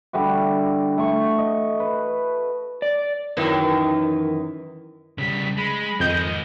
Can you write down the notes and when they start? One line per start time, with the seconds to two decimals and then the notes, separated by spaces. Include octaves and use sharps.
0.13 D3 G3 E4 F#4
0.97 A3 C#6
1.38 D#5
1.80 B4
2.82 D5
3.37 F#2 D#3 E3
5.18 C#3 G3 B6
5.57 G#3 B5
6.00 F2 D#3 G#3 D#5 G6